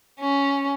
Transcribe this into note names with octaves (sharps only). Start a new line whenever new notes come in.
C#4